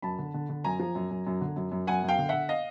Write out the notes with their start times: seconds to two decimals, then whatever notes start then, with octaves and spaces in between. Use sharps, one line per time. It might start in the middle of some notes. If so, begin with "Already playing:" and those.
0.02 F#2 A5 B5
0.19 D3
0.34 D3
0.49 D3
0.64 F#2 G#5 A#5
0.80 F3
0.95 F#2
1.11 F#2
1.27 F#2
1.41 D3
1.56 F#2
1.72 F#2
1.87 F#2 F#5 G#5
2.03 F#2
2.08 F5 G5
2.19 D3
2.29 D3 E5 F#5
2.49 D#5 F5